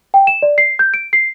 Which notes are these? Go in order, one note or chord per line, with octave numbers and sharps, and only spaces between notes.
G5
E7
D5
C7
G6
D7
C7